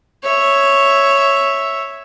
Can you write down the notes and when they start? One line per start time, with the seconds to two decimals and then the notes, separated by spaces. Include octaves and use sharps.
0.23 C#5 E5